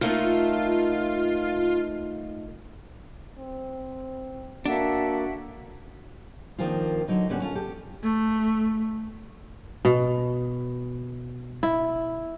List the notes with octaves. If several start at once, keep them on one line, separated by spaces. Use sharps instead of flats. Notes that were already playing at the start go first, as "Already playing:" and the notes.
A3 A#3 D#4 F4
C4
A#3 D4 F#4 A4 E5 F#5
D#3 F3 A#3 C4 D4 F4
D3 F#3 D#4
A2 D3 G3 B3 C#4 F#5
C#4 F4 A4
G4 A4
A3
B2
E4